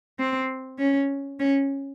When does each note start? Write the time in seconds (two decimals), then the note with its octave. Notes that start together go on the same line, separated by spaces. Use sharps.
0.19 C4
0.79 C#4
1.39 C#4